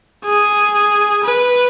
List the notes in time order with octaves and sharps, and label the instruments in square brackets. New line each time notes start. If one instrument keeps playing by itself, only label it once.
[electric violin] G#4
B4